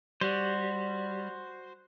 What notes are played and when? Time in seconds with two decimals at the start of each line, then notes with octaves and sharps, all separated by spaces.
0.21 G3 F#4 C5